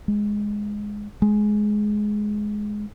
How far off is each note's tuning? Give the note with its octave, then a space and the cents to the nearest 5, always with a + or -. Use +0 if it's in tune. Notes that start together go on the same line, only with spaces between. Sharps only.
G#3 +0
G#3 +10